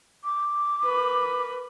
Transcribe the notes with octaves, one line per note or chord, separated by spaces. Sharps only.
D6
A#4 B4